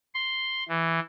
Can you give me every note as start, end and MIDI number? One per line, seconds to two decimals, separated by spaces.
0.14 0.64 84
0.68 0.99 52